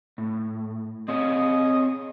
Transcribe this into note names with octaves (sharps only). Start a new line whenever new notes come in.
A2
C4 G#4 C#5 D#5